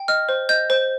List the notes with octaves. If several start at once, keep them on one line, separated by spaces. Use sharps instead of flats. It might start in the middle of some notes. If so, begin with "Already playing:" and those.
Already playing: G5
D#5 F6
C5
D#5 G6
C5